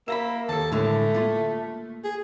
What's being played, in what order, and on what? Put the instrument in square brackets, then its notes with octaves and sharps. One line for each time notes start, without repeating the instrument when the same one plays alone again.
[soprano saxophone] A#3 [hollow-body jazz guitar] E5 A#5 B5
[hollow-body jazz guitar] D#2 A4 [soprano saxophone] A5
[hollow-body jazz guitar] A2 D3 G#3 [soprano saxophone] A3
[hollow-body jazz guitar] A#3 F4
[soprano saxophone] G#4